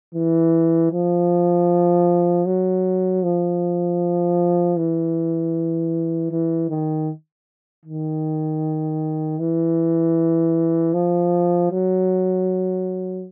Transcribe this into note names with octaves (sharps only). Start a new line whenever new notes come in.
E3
F3
F#3
F3
E3
E3
D#3
D#3
E3
F3
F#3